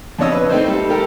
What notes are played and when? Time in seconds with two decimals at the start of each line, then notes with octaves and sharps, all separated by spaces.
0.19 F2 B2 D4 C#5 D#5 E6
0.32 B4
0.49 A3 C4 D#4 C5
0.68 G3 A4
0.89 A3 G4 A4 A#4